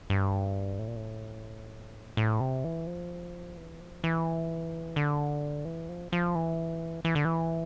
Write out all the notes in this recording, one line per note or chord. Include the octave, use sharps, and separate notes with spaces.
G2
A2
A#2
A2
A2
C3
E3
F3
E3
F3
E3
D3
E3
F3
F3
E3
E3
D3
E3